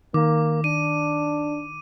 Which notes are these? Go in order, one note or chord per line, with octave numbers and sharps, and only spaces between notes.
D#3 A#3 D6
D4 D#7